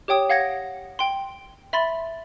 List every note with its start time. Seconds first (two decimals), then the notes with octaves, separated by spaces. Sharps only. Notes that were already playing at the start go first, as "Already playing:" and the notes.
0.08 G4 C#5 G5 D#6
0.30 F5 F#5 G#6 A#6 C#7
0.99 G5 C6
1.73 E5 B5 C6 A6